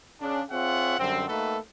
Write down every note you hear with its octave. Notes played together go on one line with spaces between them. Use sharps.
C#3 D4
C4 F4 G#4 C#5 E5 F#5
F#2 D3 G3 C4
A3 A#3 D#4 F#4 A4 B4